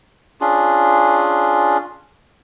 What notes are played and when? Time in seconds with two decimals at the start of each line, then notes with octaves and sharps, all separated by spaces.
0.41 C#4 D4 F4 G#4